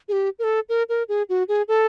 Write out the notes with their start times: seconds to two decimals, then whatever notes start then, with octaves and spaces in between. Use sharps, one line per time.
0.08 G#4
0.12 G4
0.39 A#4
0.44 A4
0.69 A#4
0.89 A#4
1.09 G#4
1.29 F#4
1.48 G#4
1.68 A4